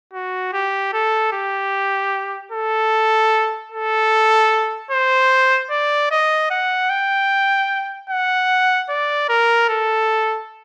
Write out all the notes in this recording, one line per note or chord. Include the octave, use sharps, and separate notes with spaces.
F#4
G4
A4
G4
A4
A4
C5
D5
D#5
F#5
G5
F#5
D5
A#4
A4